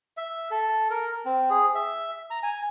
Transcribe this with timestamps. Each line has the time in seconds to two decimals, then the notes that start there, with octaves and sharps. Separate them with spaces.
0.17 E5
0.51 A4
0.91 A#4
1.26 C4
1.50 G#4
1.75 E5
2.31 A#5
2.43 G#5